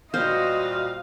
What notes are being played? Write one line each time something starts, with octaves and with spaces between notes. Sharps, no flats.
A#2 G3 F#4 C5 D#5 F5